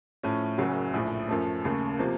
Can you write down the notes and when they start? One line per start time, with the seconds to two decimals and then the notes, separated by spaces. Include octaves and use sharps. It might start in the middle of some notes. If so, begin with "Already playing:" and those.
0.23 A2 F3 A3 C#4
0.58 F#1 F#2 C#3 F#3
0.93 A#1 A2 F3
1.29 F#2 F3 A3
1.64 D#2 C#3 A3
1.99 C3 F3 A#3